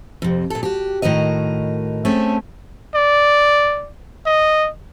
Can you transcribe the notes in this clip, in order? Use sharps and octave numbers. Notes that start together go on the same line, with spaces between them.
F2 C3
A#2 A4
F#4 G4
A2 D#3 F#4 A#4 D#5
A3 C4 C#4 G#4 A4
D5
D#5